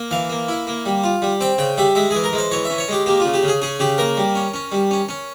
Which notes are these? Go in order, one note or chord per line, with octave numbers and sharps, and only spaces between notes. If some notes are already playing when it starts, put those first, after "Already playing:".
Already playing: A#3
E3 F5
A#3
E4
A#3
G3
F4
G3
C4 G5
C#3 G5
G3 E5
G#3 E5
E3 G#4
A#4
G#3
C5
E3 C#5
E5
C#4
C#5
G#3 G4
A#3 G4
F4
C#3
G4
C#3
G#4
C#4 G#4
C#3 G4
A#3 A#4
G3
C#4
C#4
G3
C#4
C#4